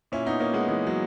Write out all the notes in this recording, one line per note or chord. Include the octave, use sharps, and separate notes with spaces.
A#2 C#4 E4
B3 D#4
A#3 C#4
G#3 B3
E3 G#3
F#3